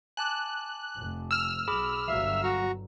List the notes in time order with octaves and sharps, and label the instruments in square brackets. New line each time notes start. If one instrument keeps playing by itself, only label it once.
[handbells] G#5 A5 D6 [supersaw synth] F#6
[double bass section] F1
[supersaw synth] E6 F6
[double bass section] B1 [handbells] G#4 B5 D6
[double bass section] G1 G2 F#3 [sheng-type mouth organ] E5 [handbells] F5
[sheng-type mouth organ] F#4 A#5 C#6